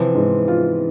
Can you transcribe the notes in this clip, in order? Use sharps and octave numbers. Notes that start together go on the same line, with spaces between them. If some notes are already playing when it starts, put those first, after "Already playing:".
Already playing: C3 E3 F3
G#2
F4